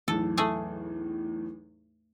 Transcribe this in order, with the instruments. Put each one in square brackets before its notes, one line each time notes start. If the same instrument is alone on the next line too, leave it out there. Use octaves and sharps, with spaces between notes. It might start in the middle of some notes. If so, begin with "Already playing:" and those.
[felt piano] B1 E2 A2 [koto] A4
[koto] A3 G#4